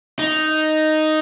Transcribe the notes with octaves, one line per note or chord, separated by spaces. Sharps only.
D#4